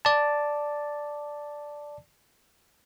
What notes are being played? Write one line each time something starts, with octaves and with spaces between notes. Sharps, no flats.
D5 A5